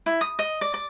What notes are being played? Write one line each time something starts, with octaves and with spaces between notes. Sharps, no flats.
E4
D#6
D#5
D5
D5